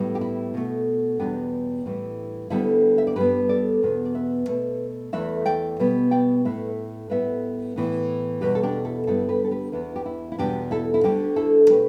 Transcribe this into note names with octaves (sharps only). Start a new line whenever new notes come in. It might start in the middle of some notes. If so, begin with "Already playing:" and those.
Already playing: A2 G3 B3
G4
E4
B2 A3
E2 B2 G3 B3 D4 G4
A2 E3 G3
D2 D3 G3 B3 E4 A4
E5
D5
G2 G3 B3 G4 B4
A4 D5
E2 B2 B3
D5
B4 E5
B2 A3
E2 E3 A3 B4 E5
D5 G5
B2 G3 B3
D5 G5
A2 A3 B4 E5
A2 G3 B3 B4 E5
A2 E3 B3
E2 B2 G3 G4 B4
A4
D4 G4
E4 A4
G2 D3 G3 B3 E4 A4
G4 B4
A4
G4 B4
E2 E3 B3 E4
G4
E4
E4
E2 B2 G3 D4 G4
E4 A4
E4
D2 D3 G3 D4 G4
E4 A4
B2 A3 G4 B4